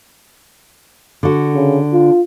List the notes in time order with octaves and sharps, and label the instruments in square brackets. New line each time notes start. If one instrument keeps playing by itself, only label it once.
[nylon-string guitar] D3 F#4
[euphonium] C#3
F4